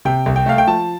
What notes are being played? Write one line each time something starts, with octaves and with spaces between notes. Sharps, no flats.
C3 G5
C2
G5
A3 F5
G5
F3 A5